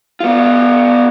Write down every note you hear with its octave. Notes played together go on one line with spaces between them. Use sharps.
B3 F4